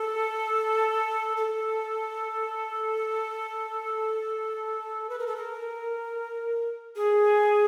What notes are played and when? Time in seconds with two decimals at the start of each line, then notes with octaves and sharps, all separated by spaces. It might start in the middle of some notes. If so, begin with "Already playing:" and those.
Already playing: A4
1.37 A4
5.09 B4
5.19 A#4
5.27 A4
5.36 A#4
6.96 G#4